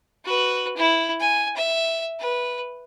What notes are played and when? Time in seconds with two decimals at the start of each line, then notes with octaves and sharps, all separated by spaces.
0.25 F#4 B4
0.77 E4
1.20 G#5
1.56 E5
2.20 B4